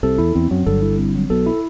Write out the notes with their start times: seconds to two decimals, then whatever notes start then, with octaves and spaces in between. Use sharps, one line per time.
0.03 C2 C3 A4
0.18 E2 E4
0.35 E2 C4
0.51 F#2 F#3
0.66 G1 G2 A4
0.82 E4
0.98 C4
1.15 F#3
1.30 B1 B2 A4
1.46 E4